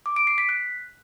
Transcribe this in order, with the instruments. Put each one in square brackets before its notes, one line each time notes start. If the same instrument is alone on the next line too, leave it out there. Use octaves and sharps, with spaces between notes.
[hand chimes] D6
D7
C7
B6
F#6